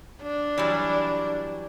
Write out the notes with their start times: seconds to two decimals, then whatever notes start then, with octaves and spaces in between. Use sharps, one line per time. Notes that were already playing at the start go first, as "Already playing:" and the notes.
0.22 D4
0.58 E3 F#3 G3